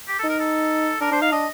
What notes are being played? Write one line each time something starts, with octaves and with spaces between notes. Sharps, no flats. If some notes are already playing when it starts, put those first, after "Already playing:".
G4
D#4 A4
A#4
A4
D4 A#4
D4 C5
D#4 F5
D4 D#5